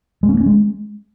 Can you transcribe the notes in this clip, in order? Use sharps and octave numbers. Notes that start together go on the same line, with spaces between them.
G#3
C#4
A#3
C#4
G#3